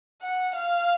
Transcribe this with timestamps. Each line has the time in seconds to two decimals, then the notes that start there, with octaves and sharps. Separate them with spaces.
0.22 F#5
0.56 F5